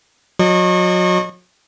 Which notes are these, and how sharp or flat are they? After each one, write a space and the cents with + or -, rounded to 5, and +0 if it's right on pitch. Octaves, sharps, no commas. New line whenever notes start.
F#3 -35 D#5 -30 C#6 -30